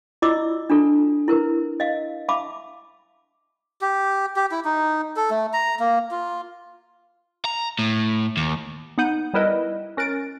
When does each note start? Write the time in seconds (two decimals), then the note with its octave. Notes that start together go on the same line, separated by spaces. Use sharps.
0.22 E4 F4 D5 D#5 D6 E6
0.70 D4 F4 A4
1.28 E4 A#4 B4
1.80 D#5 F5
2.29 E5 F5 A5 B5 D6
3.81 G4
4.36 G4
4.52 E4
4.65 D#4
5.16 A4
5.31 A3
5.53 A#5
5.80 A#3
6.11 F4
7.45 A#5
7.79 A2
8.37 D#2
8.98 B3 D#4 F#5 G6 D#7
9.34 G3 B3 E4 A#4 B4 D#5
9.97 C#4 A#4 F#6 A6 D7